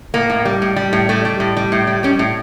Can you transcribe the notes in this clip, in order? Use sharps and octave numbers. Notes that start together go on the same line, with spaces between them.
A2 A#3
A2
G3
A2
G3
A2
G3 A3
G3
A2
G3
A2
G3
G3 C#4
A2